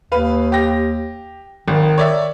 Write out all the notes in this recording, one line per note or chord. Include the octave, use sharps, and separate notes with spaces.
D#2 B4 F5
G4 A#6
G#1 D#3
C#5 D5 E5